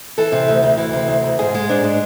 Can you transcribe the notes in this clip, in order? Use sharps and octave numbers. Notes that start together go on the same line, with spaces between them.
E3 A4
C3
D2
D2
E3
C3
D2
D2
G#2 G#4
G#3
G#2 D4
G#3